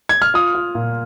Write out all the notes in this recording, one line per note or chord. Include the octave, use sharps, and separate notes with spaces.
G#6
F6
F4 D#6
F4
A#2